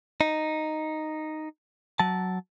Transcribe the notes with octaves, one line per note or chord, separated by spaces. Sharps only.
D#4
F#3 A5